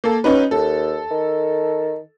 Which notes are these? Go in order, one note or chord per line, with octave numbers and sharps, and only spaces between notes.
A#3 A4
F#3 C#4 D#4 B4
D#2 A4
D#3